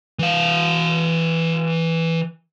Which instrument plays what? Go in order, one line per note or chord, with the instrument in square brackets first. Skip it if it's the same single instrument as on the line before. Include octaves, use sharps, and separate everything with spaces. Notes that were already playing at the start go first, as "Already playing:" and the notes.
[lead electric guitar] E3 F5